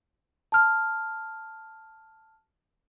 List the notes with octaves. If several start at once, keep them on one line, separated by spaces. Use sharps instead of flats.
A5 F6